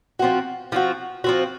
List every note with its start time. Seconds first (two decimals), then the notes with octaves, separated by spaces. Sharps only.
0.19 F3 C4 F#4
0.72 F3 C4 F#4
1.24 F3 C4 F#4